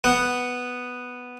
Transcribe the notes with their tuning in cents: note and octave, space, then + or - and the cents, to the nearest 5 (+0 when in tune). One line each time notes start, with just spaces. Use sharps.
B3 +0 F#5 +0